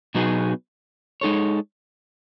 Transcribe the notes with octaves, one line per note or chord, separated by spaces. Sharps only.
B2 F#3 B3 D#4 G#4
G#3 D#4 A4 C#5